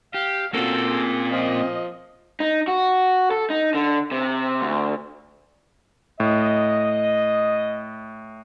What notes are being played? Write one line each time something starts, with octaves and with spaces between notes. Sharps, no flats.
G4 F5
A#3 C4 C#4 F4 F#4 A4
G#4
F3 D#5
D#4
F#4
A4
D#4
D3
C3
D2
A2 D#5